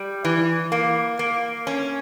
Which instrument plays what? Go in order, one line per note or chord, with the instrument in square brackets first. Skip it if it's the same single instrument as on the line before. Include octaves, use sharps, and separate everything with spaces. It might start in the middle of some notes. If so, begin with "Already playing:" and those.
Already playing: [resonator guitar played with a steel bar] G3
E3
A#3
A#3
C#4